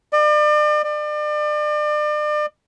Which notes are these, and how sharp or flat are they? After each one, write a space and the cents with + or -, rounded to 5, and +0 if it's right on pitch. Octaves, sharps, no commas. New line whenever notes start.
D5 +40
D5 +35